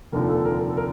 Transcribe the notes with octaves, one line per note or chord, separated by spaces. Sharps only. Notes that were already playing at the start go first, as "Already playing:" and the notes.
F1 D#2 D3 F3 A#4
A4
A#4
A#4
A4
A#4